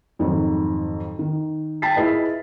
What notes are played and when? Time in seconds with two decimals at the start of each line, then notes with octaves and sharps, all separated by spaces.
0.19 F2 G#2 D#3 F#3
1.19 D#3
1.82 G5 A5 B5 A6 B6 C7
1.96 E4 F4 G#4 B4 D#5